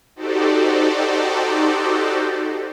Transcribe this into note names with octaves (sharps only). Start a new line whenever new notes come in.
D#4 F#4 G4 A4 C5 D5